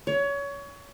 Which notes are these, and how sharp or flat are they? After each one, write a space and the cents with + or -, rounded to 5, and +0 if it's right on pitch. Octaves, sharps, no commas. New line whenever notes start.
C#5 +25